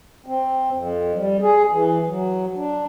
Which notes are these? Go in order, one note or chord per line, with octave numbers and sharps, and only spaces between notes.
C4
F2
G3
G#4
E3
F#3
D4